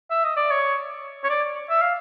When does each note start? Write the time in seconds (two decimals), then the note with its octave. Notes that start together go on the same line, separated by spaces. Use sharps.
0.10 E5
0.24 D#5
0.36 D5
0.51 C#5
1.24 C#5
1.30 D5
1.70 E5
1.81 F5